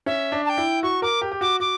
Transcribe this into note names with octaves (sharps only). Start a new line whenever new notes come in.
C#4 E5
D4
A5
G5
E4
F#4 C#6
A#4 D6
G4
G4
F#4 D6
F#4 D6